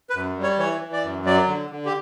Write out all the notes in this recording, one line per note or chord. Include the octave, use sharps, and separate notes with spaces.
B4
F#2
G3
C#5
E3 C#5
E3
D5
F#2
F#3 D5
D3
D3
G4